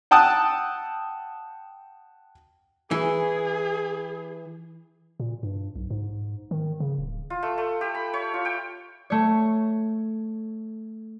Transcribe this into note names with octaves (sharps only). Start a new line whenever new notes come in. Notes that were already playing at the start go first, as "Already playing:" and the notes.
F#5 G5 A5 D#6 E6 F#6
E3 G#4
A#2
G2
B1
G#2
D#3
C#3
D1
F4
A3
A3
G4
B5
C#5
F4
G5
A3 C#5